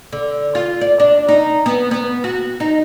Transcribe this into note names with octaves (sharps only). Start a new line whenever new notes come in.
D3
F4
D5
D4
D#4
B3
B3
F#4
D#4